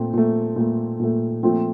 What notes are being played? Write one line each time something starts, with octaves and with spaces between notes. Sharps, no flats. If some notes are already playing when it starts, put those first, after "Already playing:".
Already playing: A#2 A3 C4
A#2 A3
A#2 A3
A#2 A3
A#2 F3 A3 C4